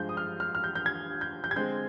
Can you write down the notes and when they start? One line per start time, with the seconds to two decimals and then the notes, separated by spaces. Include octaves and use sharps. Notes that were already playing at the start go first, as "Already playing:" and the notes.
Already playing: G2 F3 G#3 G6
0.09 D#6
0.17 F6
0.40 F6
0.55 F6
0.64 G6
0.75 G6
0.86 G#6
1.21 G6
1.44 G6
1.51 G#6
1.56 D3 G#3 C4 G6